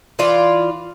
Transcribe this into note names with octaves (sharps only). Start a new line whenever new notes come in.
E3 F4 D5